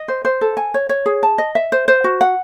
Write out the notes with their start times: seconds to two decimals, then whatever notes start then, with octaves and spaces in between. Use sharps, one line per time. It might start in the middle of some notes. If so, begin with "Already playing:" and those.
Already playing: D#5
0.08 C5
0.25 C5
0.41 A4
0.57 G#5
0.74 C#5
0.89 C#5
1.06 G#4
1.23 A5
1.38 D#5
1.55 E5
1.72 C5
1.88 C5
2.04 F#4
2.21 F#5